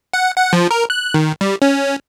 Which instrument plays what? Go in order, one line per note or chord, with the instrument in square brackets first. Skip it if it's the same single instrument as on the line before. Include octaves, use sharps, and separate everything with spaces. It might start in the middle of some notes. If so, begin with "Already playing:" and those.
[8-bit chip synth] F#5
F#5
F3
A#4
F#6
D#3
G3
C#4